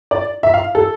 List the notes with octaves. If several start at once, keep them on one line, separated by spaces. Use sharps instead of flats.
D5
E5
F5
A4